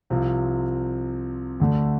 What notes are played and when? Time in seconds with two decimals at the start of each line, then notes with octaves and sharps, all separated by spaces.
0.10 C2 C3 F3 C4 F4
1.60 D2 D3 A3